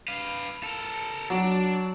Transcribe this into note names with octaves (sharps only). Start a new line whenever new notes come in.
B4 F5
A4 A#4
F#3 D4